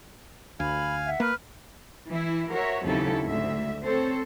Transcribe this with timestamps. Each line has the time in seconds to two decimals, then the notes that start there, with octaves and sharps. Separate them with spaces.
0.60 D2 F5 G#5 B5
1.06 E5 F#5
1.20 A#3 B4 F6
2.09 E3 E4
2.51 F#4 A#4 C5 C#5 E5
2.84 D#2 C#3 F#3 C4 E4 A4
3.25 D2 G#2 E5
3.83 C4 A4 C5 C#5